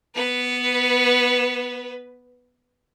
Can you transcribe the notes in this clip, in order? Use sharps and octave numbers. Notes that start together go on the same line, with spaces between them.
B3 B4